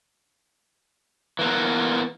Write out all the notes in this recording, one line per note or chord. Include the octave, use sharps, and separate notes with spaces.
E3 A#3 B3